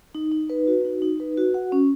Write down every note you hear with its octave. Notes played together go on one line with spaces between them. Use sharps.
D#4
D#4
B4
F#4
D#4
D#4
B4
F#4
F#5
C#4